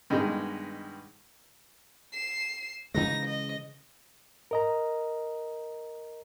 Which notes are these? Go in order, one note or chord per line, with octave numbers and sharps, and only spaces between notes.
G2 B2 D#3 G#3
C7 E7
C#3 E3 G#3 D#4 A#6
D#5
A#4 D#5 A#5